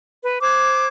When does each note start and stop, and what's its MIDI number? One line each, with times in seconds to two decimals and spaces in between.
0.22 0.38 71
0.43 0.87 72
0.43 0.87 86
0.43 0.87 90
0.43 0.87 92